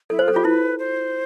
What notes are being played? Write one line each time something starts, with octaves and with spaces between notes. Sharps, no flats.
E4 A4
C5
F4
A4
F4 G4
E4 B4
C5